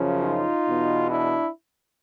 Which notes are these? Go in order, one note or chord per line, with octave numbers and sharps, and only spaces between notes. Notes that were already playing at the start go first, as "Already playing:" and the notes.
Already playing: F#2 C#3 F3
D#4 F4
E2 B2
D4 E4